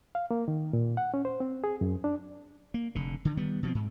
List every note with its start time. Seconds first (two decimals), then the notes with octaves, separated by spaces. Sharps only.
0.15 F5
0.31 A#3
0.48 D#3
0.73 A#2
0.97 F#5
1.14 C#4
1.25 C5
1.40 C4
1.64 G#4
1.81 F#2
2.04 D4
2.74 A#3
2.95 F1 D3
3.25 D3 D#3
3.37 D#3 G3 B3
3.63 B2 F3 C4
3.75 G#2